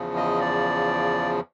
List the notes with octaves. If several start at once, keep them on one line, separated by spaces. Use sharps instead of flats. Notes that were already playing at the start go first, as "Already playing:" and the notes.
Already playing: E2 C#3 F3
D#5
D5